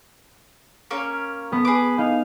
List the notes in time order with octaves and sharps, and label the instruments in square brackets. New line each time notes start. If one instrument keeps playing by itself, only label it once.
[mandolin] A#3 C#4 C#5
[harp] B3 A4
[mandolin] G#4 D6 [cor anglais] B4
[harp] D#4 [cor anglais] F5